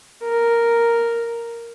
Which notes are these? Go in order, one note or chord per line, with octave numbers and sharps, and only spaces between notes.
A#4